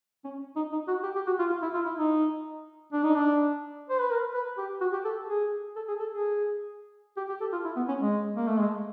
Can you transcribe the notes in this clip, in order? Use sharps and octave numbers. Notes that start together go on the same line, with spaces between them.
C#4
D#4
D#4
F#4
G4
G4
F#4
F4
F4
E4
F4
E4
D#4
D4
D#4
D4
C5
B4
A#4
B4
G4
F#4
G4
A4
G#4
A4
G#4
A4
G#4
G4
G4
A4
F4
E4
B3
C#4
G#3
A#3
A3
G#3